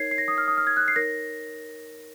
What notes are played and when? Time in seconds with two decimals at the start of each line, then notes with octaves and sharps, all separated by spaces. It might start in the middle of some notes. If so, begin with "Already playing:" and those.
Already playing: D#4 A#4 C#5 G#6 C7
0.11 C7
0.18 A#6
0.28 D#6
0.38 F6
0.48 D#6
0.58 F6
0.67 G#6
0.77 F#6
0.88 C7
0.95 D#4 A#4 C#5 A#6